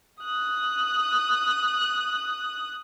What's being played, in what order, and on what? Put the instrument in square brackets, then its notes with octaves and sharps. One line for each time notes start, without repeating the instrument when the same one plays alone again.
[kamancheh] D#6 F#6